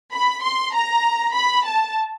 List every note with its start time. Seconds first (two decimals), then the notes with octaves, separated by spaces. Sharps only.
0.12 B5
0.43 C6
0.74 A#5
1.35 B5
1.65 A5